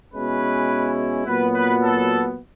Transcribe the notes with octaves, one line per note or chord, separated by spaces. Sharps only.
B2 G#3 C#4 E4 B4
A#2 F#3 B3 B4
B4
A4